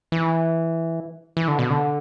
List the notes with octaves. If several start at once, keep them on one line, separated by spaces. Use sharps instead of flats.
E3
E3
D3
B2
D3